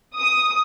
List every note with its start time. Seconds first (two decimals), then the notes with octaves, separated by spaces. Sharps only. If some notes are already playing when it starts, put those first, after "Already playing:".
0.17 D#6